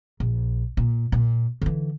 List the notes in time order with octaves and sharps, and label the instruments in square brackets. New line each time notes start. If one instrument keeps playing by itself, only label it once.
[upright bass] A#1
A#2
A#2
D3 E3